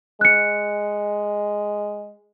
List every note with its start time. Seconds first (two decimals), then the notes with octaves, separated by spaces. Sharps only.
0.21 G#3 F#6 C#7